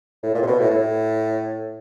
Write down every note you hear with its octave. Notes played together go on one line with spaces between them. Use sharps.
A2
A#2
C3
B2
A2
A2